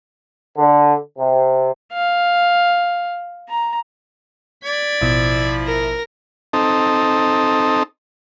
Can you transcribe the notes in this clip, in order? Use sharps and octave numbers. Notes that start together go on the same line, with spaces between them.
D3
C3
F5
A#5
D5 G#6 B6
A1 B2 F3 E4
A#4 A#6
C4 D#4 A4